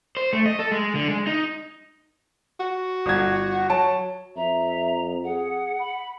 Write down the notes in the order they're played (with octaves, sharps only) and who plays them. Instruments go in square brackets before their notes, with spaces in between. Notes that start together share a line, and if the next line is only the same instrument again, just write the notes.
[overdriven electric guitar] C5
A3
D#5
A4
G#3
D3
G#3
D#4
[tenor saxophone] F#4
[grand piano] G1 G#6
[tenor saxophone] F#3 [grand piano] A5
[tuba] F2 [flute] E5 [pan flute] A#5
[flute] G#4 [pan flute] F#5
[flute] B5